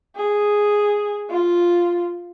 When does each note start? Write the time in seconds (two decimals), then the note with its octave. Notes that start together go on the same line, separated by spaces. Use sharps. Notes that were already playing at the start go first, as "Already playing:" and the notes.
0.16 G#4
1.30 F4